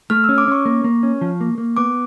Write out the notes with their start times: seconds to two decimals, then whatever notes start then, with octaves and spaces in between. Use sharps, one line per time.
0.10 A3 F6
0.24 C#4 E6
0.38 D6
0.48 C#4 C#6
0.65 A#3
0.84 A#3
1.03 C#4
1.21 F3
1.41 A#3
1.58 A#3
1.77 B3 D6